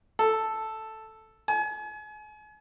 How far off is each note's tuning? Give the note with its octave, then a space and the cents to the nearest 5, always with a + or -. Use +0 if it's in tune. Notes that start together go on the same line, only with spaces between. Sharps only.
A4 +0
G#5 +35